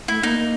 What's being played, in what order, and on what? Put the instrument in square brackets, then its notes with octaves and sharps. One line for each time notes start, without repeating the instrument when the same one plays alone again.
[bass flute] A3 [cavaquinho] E4
[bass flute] A#3 [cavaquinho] D#4
[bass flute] A#3